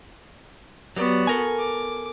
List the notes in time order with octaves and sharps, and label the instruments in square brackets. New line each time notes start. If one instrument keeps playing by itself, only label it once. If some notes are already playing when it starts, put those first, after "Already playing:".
[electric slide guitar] F#3 G4 D5 [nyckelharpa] B3 F#4
[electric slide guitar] A4 A#4 G#5
[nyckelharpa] D6